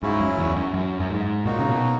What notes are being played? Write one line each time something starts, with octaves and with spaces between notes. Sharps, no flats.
G#2 C#3 F#3 C#4 E4
F#2
E2
F#2
F#2
F#2
G#2
A#2 F#3 A#3 D#4 F#4
C#3
B2